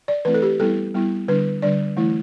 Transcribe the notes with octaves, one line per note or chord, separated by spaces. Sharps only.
D5
E3 A3 C4 E4 B4
A4
G4
G3 B3 E4 A4
G3 B3 E4
D3 G3 D4 B4
D3 G3 D4 D5
E3 A3 E4